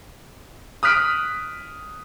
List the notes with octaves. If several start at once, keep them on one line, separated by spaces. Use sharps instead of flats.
D#6 F6 F#6 B6 D7